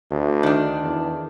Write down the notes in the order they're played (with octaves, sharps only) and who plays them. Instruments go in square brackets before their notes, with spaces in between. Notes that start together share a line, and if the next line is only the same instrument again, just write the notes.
[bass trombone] D2
[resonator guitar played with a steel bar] D#3 D4
[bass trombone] E2